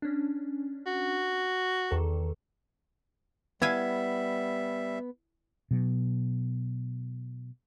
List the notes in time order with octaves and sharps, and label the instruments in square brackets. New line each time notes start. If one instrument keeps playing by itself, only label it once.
[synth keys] C#4 D4
[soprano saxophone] F#4
[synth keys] E2 D#3 A4
[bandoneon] G3 E5 [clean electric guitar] B3 [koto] E4 F5 G#5
[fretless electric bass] B2 F#3